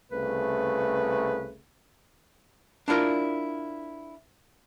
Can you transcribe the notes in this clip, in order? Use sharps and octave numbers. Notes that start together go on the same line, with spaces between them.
C2 C#3 A3 B4
D4 E4 F4 A#4 D5